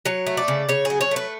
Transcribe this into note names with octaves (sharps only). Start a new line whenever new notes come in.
F#3 C#5
A3
D5
C#3
C#3 C#5
G#4
F#3
C#5
A3 B4